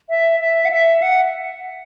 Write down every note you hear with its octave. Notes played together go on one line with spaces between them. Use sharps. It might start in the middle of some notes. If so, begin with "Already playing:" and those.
E5
E5
F#5
E5
F#5